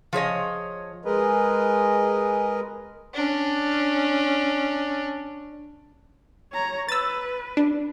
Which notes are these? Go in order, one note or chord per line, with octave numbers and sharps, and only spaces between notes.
F3 G#4 C#5 D#5
G#3 G#4 A#4 B4 D#5
C#4 D4
C#5 A#5
B4 E6 A6
D4